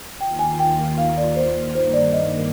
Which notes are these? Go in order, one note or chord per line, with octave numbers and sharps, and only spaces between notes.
D#2 D#3 A#3 F4 G5
G#5
G5
F5
D5
C5
G2 D#3 A#3 C5
D5
D#5